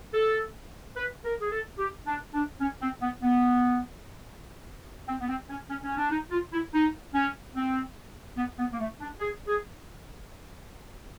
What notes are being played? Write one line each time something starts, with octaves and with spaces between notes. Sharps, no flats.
A4
B4
A#4
G#4
A4
G4
D4
D4
C#4
C4
B3
B3
C4
B3
C4
C#4
C#4
C#4
D4
D#4
F4
E4
D#4
C#4
C4
B3
B3
A#3
A3
D4
G#4
G#4